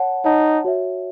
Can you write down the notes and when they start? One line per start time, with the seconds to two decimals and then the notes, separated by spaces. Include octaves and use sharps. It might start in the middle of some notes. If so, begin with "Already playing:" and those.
Already playing: C#5 F#5 A5
0.25 D#4 C#5 F#5 A5
0.65 F#4 C#5 E5